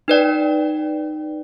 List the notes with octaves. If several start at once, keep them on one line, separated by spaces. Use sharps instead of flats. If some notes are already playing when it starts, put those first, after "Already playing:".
D#4 B4 D5 G5